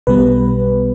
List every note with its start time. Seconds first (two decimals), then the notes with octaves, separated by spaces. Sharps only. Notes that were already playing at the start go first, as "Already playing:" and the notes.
0.07 B1 B2 G3 B3 B4